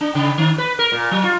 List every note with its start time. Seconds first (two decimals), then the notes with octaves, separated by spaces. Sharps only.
0.01 D4
0.15 C#3
0.38 D#3
0.58 B4
0.79 A#4
0.92 A#2
1.11 F#3
1.24 F4